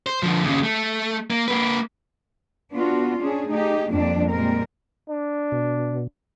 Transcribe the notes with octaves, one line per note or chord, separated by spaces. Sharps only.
C5
D3 F3
D#2 C#3
A3
A#3
A#3 B4
B3 D4 F4 F#4
C#4 D4 G#4
A3 D#4 G4 G#4
F2 G3 A#3 D4 D5
A#2 G3 G#3 A#3 C4 A#4
D4
B2